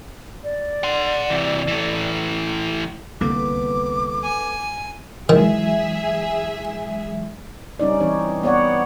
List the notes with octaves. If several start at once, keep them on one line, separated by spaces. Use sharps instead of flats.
D5
F#5 C6
C3 E3
E3 A3
C2 D3 A#3 B3 A4 B4 D6
G#5
D#3 E3 F#3 G#3 G#4 E5
G3 C#4 D#4 D5
E3 C4 D#4 C#5
B3 C#5 D5 F#5